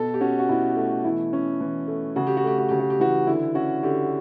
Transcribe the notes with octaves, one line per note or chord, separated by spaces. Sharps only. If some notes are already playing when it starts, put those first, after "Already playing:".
Already playing: B2 A4
G4
C#4 F#4
F#4
B2 E4
A3
E3 E4
C#4
E3
A3
C#3 F#4
G4
F#4
A3 G4
F#4
C#3 G4
F#4
G4
E3 F#4
D3 E4
C#4 F#4
D3 G4